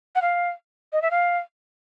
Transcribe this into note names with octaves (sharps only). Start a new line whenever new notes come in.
F#5
F5
D#5
E5
F5